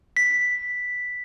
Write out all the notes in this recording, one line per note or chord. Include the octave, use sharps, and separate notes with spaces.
B6